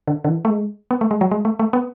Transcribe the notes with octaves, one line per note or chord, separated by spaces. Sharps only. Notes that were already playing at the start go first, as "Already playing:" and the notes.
D3
D3
E3
A3
G#3
B3
A3
G#3
F#3
G#3
A3
A3
B3